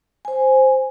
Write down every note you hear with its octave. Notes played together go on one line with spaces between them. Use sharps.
C5 G#5